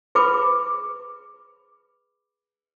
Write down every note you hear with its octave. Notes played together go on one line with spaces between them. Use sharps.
G#4 B4 B5 D6